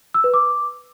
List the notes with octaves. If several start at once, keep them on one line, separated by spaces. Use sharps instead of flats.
E6
B4
D6